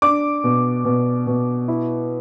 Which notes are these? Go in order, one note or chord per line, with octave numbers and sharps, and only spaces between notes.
D4 D6
B2
B2
B2
E4